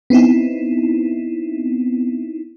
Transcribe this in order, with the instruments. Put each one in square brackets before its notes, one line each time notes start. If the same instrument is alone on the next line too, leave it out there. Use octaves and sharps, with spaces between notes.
[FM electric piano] B3 C4 D#4 E4